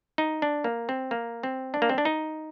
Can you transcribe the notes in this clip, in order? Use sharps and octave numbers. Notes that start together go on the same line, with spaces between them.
D#4
D4
A#3
C4
A#3
C4
D4
A#3
C4
D4
D#4